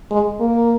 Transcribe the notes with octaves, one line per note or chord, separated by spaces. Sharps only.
G#3
A#3